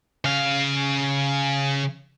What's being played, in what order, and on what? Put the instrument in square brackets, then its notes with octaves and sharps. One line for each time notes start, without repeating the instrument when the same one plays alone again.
[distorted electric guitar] C#3 F5